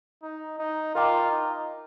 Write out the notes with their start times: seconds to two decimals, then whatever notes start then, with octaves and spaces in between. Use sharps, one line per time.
0.23 D#4
0.59 D#4
0.95 F4 A#4 D#5 G5 A#5 D6
1.32 D#4